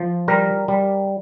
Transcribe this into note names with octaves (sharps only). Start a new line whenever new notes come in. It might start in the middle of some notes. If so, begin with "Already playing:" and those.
Already playing: F3
G3 A#4
G3